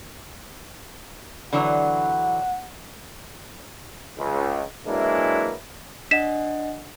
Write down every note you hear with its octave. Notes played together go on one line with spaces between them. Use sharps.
D3 E3 F#3 F#5
C#2
E3 F#3 G#3 A#3 D4 E4
D4 D#5 F#5 B6 E7